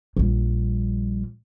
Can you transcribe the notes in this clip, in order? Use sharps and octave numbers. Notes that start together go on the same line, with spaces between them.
A#1 G3